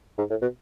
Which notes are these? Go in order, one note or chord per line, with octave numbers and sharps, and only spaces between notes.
G#2
A2
B2